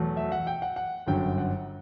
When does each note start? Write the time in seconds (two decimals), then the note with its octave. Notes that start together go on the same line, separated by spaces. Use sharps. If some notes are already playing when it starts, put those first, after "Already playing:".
Already playing: E2 B2 F#3 A3
0.17 E5
0.32 F#5
0.47 G5
0.62 F#5
0.76 F#5
1.07 G1 F#2 D3 G5
1.38 F#5